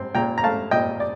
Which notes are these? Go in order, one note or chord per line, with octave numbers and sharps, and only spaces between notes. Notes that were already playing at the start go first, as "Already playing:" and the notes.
Already playing: C4 C6
A#2 G5 A#5
A#5
A3 F5 A5
A#2 D#5 G5
D5